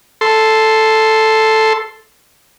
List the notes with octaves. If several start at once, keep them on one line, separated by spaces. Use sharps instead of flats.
A4 C6